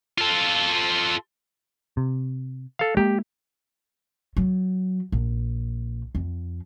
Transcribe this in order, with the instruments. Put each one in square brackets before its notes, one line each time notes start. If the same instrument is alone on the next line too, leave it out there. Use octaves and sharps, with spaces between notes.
[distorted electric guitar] F4 A4
[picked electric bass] C3
[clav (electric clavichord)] A4 F5
[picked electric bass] G#3 A#3 [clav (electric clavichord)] G4
[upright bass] F#3
A#1
F2